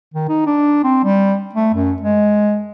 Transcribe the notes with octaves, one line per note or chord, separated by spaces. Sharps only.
D#3
D#4
D4
C4
G3
A3
F#2
G#3